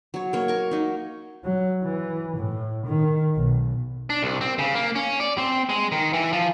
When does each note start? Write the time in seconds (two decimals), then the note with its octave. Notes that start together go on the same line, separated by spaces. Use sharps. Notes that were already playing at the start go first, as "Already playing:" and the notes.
0.14 F#3 C#5
0.33 A#3 C#5
0.48 A#4 C#6
0.71 F#3 D#4
1.44 F#3
1.84 E3
2.37 A2
2.86 D#3
3.36 B1
4.10 D4
4.23 C2
4.41 C4
4.59 C#3
4.75 A#3
4.95 C#4
5.20 D5
5.38 C4
5.69 G#3
5.92 D#3
6.13 E3
6.33 F3